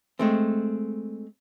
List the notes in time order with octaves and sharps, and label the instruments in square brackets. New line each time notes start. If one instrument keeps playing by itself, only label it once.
[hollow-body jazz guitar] G#3 A3 C4